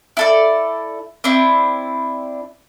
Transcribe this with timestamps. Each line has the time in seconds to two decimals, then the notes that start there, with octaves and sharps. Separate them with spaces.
0.17 E4 A4 D5
1.24 C4 D4 E4